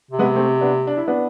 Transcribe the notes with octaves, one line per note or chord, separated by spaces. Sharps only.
C3
G#3 B3
A3 C4
B3 D4
D4
E4
B3 D4